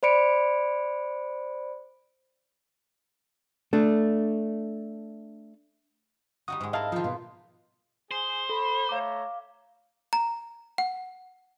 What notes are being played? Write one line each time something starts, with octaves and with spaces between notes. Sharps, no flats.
C5 D5 B5 C#7 D7
A3 D4
G3 D#4 F#4 D#6
G#2 G#3
E4 A#4 D#5 F5 A5
D#3 F3 D#4 F4
B2
G#4 C5
A4 B5
A3 C#5 F5 A#5 D6
A#5
F#5